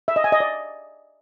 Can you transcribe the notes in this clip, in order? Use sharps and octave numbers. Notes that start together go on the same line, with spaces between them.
E5
D#5
G#5
D#5
D5